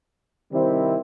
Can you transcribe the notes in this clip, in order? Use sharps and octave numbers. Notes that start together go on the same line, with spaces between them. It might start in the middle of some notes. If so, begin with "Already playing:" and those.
C3 D#3 G3 C4 E4